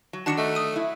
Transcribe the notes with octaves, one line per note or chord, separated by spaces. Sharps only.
F#3
D#3 D4 F#4 A5 C#7 E7
A3 D#5
D#6 D#7
F#3 E4